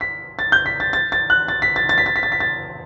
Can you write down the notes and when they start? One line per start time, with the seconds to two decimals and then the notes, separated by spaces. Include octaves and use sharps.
0.01 B6
0.39 A6
0.52 G6
0.66 B6
0.80 A6
0.93 A6
1.12 A6
1.30 F#6
1.48 A6
1.62 B6
1.76 A6
1.89 A6
1.98 B6
2.06 A6
2.16 B6
2.23 A6
2.32 B6
2.40 A6